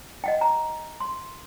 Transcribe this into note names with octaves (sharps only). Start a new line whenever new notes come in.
D#5 F#5 G5
A#5
C6